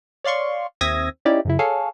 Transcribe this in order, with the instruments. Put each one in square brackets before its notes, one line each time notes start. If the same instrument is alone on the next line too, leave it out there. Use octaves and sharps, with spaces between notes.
[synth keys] C#5 D5 F5 C6 C#6
D#2 C4 E5 D#6 G#6 A#6
C#4 D#4 E4 G4 D5
F#2 C#3 E4
G#4 A4 C#5 F5